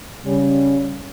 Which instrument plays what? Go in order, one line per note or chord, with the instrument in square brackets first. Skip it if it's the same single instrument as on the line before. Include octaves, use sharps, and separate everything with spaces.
[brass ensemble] C#3 G3 C#4